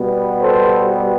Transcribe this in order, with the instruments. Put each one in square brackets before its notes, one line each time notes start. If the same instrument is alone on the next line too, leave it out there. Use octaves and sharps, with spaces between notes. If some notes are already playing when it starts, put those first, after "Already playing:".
Already playing: [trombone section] B2 G3 B3
A4 C5